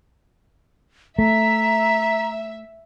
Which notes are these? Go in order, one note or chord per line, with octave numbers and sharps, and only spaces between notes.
A3 E5 A#5 B6